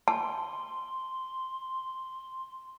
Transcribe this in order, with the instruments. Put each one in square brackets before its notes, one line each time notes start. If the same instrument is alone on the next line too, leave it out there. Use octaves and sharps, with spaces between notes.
[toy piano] G#5 A5 [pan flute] C6